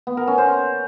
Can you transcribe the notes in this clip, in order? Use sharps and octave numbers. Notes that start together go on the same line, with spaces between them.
B3
A#4
C#4
C5